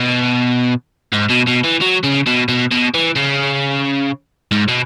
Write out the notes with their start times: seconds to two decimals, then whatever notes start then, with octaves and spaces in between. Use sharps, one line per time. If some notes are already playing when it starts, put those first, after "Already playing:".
Already playing: B2
1.13 G#2
1.30 B2
1.48 B2
1.65 E3
1.82 F#3
2.04 C#3
2.27 B2
2.48 B2
2.71 B2
2.94 E3
3.16 C#3
4.51 G#2
4.68 B2